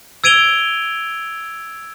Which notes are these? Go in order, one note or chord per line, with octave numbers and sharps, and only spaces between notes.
E6 G#6 D7 D#7 F7 G7